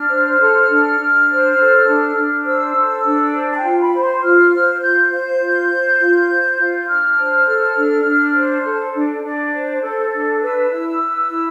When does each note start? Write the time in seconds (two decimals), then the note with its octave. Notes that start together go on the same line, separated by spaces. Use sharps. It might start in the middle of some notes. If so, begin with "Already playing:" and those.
Already playing: D4 F6
0.10 C5
0.41 A4
0.70 D4
0.99 D4
1.28 C5
1.58 A4
1.87 D4
2.17 D4
2.46 C5 E6
2.76 A4
3.06 D4
3.34 C5
3.53 A5
3.57 G5
3.63 F4
3.79 B5
3.94 C5
4.01 C6
4.23 F4 F6
4.52 C5 F6
4.81 F4 G6
5.11 C5 G6
5.40 F4
5.71 C5
6.00 F4
6.29 C5
6.58 F4
6.87 D4 F6
7.18 C5
7.47 A4
7.76 D4
8.05 D4
8.35 C5
8.65 A4
8.94 D4
9.24 D4
9.53 C5
9.83 A4
10.12 D4
10.42 B4 E6
10.70 E4
11.00 B4
11.30 E4